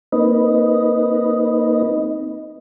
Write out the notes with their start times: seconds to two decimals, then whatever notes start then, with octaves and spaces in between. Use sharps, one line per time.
0.12 A#3 C4 D#4 B4 D#5